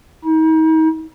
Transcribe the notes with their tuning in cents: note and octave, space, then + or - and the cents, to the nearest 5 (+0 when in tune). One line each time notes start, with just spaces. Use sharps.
D#4 +40